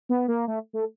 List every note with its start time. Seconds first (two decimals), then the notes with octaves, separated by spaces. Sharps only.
0.09 B3
0.28 A#3
0.48 A3
0.73 A3